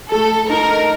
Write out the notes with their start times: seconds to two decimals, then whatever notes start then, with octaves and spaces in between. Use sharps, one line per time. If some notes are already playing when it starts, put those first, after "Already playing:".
0.12 A3 A4
0.49 D#4 A#4